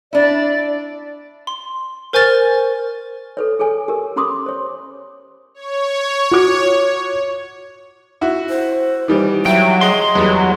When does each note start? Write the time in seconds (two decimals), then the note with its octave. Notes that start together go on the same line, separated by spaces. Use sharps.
0.13 D4 E4 D5
1.47 C6
2.13 A#4 C5 G#5 C#6 F6 A6
3.37 A4 B4 C#5
3.59 G#4 A4 C#5 G#5
3.88 G4 A#4
4.16 C#4 G4 B5 C6 D6 D#6
4.46 C5 C#5
5.54 C#5
6.31 F#4 D6
8.21 E4 F#4
8.49 C5
9.08 D#3 E3 G3
9.46 F#3 E5 G5
9.81 G#4 D#5 C6
10.15 E2 F#3 G3